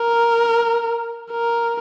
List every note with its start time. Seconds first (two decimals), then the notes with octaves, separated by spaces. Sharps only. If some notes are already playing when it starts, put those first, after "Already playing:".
Already playing: A#4
1.31 A#4